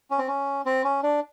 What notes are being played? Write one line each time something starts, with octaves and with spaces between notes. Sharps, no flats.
C#4
C4
C#4
C4
C#4
D4